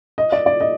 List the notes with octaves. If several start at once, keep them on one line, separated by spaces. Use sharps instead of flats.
D#5
D5
D5
D#5